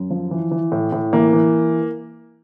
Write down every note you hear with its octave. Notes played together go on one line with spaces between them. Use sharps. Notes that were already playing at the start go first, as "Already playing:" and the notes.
Already playing: F#2
F3
E3
E3
A2
A2
E3 A#3
E3